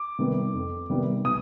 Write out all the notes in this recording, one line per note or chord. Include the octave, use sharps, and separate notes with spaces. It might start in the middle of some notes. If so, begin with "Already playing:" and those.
Already playing: D6
C3 D#3 G3 B3
F2
C3 D#3 G3 B3
B2 D#6